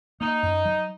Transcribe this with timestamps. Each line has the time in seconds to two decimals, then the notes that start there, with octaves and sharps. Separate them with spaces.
0.20 A#3 D#4
0.43 F#2
0.65 F#3